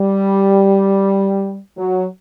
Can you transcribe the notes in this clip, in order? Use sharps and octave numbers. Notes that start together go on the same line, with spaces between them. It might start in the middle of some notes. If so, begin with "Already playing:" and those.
Already playing: G3
F#3